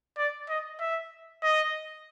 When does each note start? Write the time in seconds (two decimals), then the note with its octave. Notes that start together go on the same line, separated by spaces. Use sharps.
0.17 D5
0.49 D#5
0.80 E5
1.43 D#5